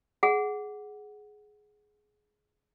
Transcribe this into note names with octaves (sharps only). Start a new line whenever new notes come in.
G#4 F#5